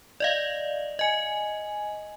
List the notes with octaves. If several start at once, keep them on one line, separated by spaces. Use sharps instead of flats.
D5 D#5 F5
D#5 G#5